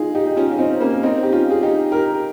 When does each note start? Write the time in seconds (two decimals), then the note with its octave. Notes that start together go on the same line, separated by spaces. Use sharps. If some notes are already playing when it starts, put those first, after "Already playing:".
Already playing: D#4 F4 G#4
0.15 D#4 G4
0.26 D#4
0.36 C#4 F4
0.52 C#4
0.58 C4 D#4
0.81 A#3 C#4
1.03 C4 D#4
1.23 G4
1.32 C#4 F4
1.50 G#4
1.62 D#4 G4
1.92 G4 A#4